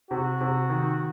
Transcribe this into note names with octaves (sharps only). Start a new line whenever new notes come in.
C3 F#4
C3
D#3